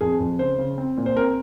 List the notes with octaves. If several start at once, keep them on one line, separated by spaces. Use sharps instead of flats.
F2 G#4
F2
C#3 C5
C#3
C4
A#2
C5
C4 A#4